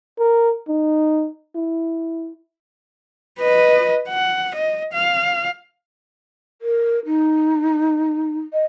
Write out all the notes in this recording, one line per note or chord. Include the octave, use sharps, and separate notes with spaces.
A#4
D#4
E4
B4 D#5
F#5
D#5
F5
A#4
D#4
D#5